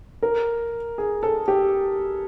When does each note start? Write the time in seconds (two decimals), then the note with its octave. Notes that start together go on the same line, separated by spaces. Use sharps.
0.22 A#4
0.98 G#4
1.23 A4
1.48 G4